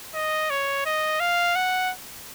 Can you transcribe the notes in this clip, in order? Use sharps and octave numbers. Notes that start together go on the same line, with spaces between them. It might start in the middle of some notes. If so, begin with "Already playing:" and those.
D#5
C#5
D#5
F5
F#5